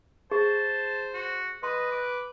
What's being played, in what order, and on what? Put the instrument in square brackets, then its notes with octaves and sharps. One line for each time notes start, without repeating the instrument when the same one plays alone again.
[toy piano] G#4 [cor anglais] C5 [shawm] A5
[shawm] F#4
[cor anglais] B4 [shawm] D#5 [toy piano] C6
[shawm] D6